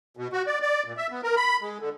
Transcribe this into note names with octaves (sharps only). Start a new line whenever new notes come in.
B2
F#4
D5
D5
A#2
E5
B3
A#4
B5
G#3
D3